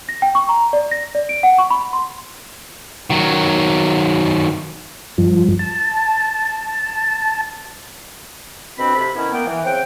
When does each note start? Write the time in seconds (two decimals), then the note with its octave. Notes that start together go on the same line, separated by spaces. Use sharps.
0.09 A#6
0.22 G5
0.35 C#6
0.49 A#5
0.73 D5
0.91 A#6
1.15 D5
1.29 D7
1.43 F#5
1.58 C#6
1.70 B5
1.93 C6
3.10 D#3 F#3
5.18 G2 F3
5.59 A5
8.78 F2 B2 C4 D4 F#4 B5
8.95 C3 A4 B5
9.15 D#3 B3 C#4 E4
9.32 A#3 B3 G5
9.47 E3
9.64 C#3 C4 F#5 G5